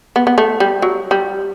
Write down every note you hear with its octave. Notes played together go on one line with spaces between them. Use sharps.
B3
B3
A3
G3
F#3
G3